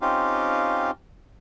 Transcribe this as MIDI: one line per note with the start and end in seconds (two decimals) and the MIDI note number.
0.01 0.91 60
0.01 0.91 61
0.01 0.91 63
0.01 0.91 65
0.01 0.91 67
0.01 0.91 77